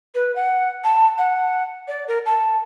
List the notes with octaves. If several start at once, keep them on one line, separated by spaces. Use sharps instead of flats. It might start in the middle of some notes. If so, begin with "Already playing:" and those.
B4
F#5
A5
F#5
D5
A#4
A5